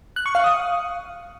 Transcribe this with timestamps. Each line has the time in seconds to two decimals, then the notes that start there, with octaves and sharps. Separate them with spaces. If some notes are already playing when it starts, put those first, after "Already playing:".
0.16 F#6
0.26 C#6
0.35 F5
0.44 D#6